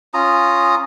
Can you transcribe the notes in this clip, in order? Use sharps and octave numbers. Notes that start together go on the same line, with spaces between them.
C#4 F4 A#5 D#6